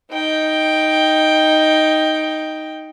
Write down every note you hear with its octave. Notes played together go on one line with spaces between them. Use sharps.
D#4 G5